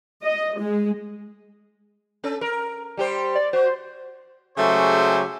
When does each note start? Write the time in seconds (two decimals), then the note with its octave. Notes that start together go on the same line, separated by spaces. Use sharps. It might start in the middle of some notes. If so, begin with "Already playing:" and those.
0.22 D#5
0.59 G#3
2.24 C#4 A4
2.41 A#4
2.97 G3 G4 C5
3.35 D5
3.53 F#4 C5
4.58 C#3 F#3 G#3 A3 G4 C5